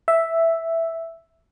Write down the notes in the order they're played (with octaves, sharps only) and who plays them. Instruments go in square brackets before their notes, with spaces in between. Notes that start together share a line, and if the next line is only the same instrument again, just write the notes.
[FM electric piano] E5